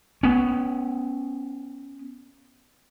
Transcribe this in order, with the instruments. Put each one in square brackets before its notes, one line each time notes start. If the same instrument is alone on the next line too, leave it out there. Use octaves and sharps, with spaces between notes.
[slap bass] B3 C#4